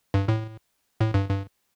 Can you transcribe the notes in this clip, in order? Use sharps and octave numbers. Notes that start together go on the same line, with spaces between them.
G2
A2
A2
G2
G2